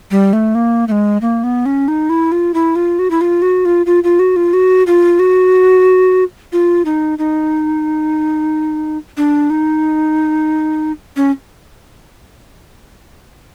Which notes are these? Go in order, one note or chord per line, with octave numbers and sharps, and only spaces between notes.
G3
A3
A#3
A3
G#3
A#3
B3
C#4
D#4
E4
F4
E4
F4
F#4
E4
F4
F#4
F4
F4
F4
F#4
F4
F#4
F4
F#4
F4
D#4
D#4
D4
D#4
C#4